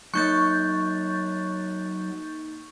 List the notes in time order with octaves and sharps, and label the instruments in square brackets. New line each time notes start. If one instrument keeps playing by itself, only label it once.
[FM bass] F#3 [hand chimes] A#3 D#4 F#6 [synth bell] C#6 G6 A6